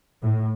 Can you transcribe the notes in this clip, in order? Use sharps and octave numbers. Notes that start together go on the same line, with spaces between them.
A2